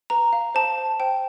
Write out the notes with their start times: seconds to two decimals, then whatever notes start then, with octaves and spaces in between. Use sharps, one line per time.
0.10 B4 A#5
0.33 F5
0.55 C5 A5
0.78 C5
1.00 C5 G5